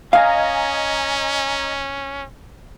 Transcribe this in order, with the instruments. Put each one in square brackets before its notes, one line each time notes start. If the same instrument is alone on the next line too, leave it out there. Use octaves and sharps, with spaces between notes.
[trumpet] C#4 [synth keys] D#5 G#5 A#5 [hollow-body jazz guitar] F5